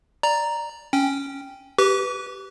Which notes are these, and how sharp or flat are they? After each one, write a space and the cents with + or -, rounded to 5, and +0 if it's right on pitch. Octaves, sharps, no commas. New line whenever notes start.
D5 +5 A#5 +0
C#4 +0 G5 +0
G4 -10 B4 +0 D6 -45